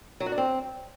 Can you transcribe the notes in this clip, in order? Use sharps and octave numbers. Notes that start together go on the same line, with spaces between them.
F#3
F#4
D4
C4